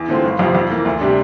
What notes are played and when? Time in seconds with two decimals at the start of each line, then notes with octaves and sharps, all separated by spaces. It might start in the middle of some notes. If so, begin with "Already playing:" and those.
Already playing: E2
0.08 D3 A3 C4 F4
0.24 G1
0.39 F2 C3 F3 C4
0.55 F2
0.70 E3 A#3
0.86 D2
1.01 C3 G3 D4